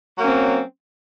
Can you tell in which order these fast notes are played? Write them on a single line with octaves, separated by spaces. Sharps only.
F#3 A#3 C#4 C4